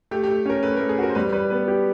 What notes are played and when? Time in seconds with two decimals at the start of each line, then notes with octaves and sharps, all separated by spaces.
0.11 A3 G4
0.24 G4
0.29 A3
0.46 C#4 A#4
0.63 A3 B4
0.77 A#4
0.80 A3
0.89 G#4
0.98 F#4 A#4
1.10 C5
1.15 G3 B4
1.33 G3 B4
1.50 B3 B4
1.68 G4